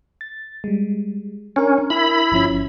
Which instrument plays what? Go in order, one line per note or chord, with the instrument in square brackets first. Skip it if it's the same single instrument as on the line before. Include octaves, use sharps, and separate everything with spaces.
[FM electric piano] A6
G3 G#3
[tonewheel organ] C#4 [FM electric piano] D4 A#4
[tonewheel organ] E4 B5
[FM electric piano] G1 F3 C#4